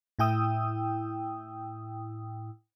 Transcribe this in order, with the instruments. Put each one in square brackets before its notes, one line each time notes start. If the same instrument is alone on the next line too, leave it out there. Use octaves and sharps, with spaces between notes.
[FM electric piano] A2 E4 G5 D#6 E6